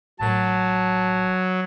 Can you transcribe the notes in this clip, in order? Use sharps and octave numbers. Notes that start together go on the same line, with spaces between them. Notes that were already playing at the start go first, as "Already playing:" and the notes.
A1 A2 F#3 A#4 A5